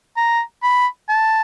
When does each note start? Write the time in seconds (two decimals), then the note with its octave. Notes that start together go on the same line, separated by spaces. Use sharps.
0.17 A#5
0.63 B5
1.09 A5